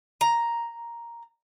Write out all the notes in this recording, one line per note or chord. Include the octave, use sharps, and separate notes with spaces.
A#5